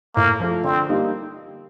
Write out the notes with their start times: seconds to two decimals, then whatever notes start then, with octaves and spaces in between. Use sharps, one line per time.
0.16 A2 A#3
0.40 F3 A3
0.64 D3 C4
0.89 G3 A#3 D#4 G4